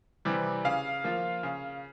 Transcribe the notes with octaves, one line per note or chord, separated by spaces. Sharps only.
C3 E3 G3
C#3 F5
F3 A#3 F4
C#3